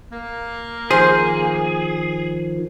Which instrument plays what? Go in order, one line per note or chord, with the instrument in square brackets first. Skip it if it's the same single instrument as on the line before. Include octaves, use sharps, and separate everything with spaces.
[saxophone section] A#3
[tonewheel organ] D#3 F3 [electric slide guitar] G#4 [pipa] C5